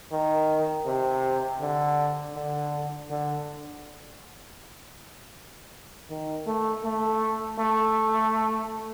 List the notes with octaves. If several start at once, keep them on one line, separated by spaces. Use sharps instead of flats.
D#3
C3
D3
D3
D3
D#3
A3
A3
A3